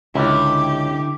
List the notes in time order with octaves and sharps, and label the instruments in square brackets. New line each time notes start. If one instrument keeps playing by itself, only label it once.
[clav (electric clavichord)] C#2 [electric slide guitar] D3 E4 [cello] G4